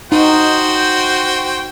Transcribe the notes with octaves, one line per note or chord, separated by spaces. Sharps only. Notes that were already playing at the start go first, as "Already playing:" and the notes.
D#4 F#4 C5 G5